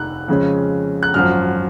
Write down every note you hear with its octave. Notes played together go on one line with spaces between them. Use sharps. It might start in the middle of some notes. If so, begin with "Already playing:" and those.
Already playing: F1 D#2 D#3 F#6
F2 C#3 G#3 C#4
F#6
G#1 F#2 F3 F6